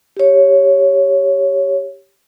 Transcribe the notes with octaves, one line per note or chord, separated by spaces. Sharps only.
G4 C#5